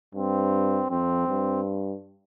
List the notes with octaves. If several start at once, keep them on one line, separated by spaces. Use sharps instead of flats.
G2 C4
F2 C4
G2